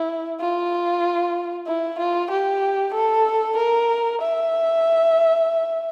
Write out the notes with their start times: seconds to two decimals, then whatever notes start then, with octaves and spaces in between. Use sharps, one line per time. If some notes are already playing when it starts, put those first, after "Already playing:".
Already playing: E4
0.40 F4
1.67 E4
1.99 F4
2.31 G4
2.94 A4
3.57 A#4
4.22 E5